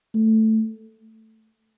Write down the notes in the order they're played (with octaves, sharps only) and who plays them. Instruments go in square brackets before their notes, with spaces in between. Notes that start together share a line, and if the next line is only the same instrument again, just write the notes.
[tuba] A3